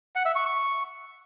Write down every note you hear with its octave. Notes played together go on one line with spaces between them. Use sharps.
F#5
E5
C#6
C#6